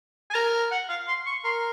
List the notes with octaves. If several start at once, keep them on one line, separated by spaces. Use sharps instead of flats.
G#5
A#4 A#5
F#5
F5
C6
C#6
A#4 C6